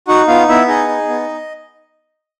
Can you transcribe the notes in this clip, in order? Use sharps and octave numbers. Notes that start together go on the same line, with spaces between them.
D#4 F#4 F#5
B3 F4 F5
B3 E4 E5
D#4 G#4 D#5
D#4
B3